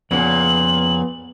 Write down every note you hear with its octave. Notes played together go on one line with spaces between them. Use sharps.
F2 A#2 C#3 B3 B4 F#7